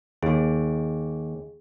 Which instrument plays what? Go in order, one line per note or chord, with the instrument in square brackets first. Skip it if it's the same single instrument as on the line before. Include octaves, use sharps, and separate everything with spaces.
[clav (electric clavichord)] D#2 [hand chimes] G#4